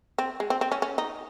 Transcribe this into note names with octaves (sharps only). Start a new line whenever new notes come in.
C4
G#3
C4
C4
C#4
C#4
D#4